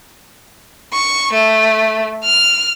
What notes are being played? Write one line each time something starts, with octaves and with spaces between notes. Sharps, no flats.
C#6
A3
F6